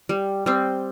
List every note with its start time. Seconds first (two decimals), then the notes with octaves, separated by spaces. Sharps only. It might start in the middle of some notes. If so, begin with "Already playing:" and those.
0.09 G3
0.46 G3 C4